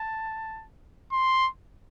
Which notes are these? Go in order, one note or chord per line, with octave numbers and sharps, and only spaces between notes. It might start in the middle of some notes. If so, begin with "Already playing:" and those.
Already playing: A5
C6